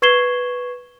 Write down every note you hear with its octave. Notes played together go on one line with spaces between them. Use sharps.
B4 C#6 G#6 C7 E7 G7